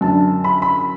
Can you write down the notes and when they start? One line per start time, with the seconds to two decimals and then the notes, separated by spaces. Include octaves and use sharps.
0.01 F#2 D3 A5
0.44 B5
0.62 B5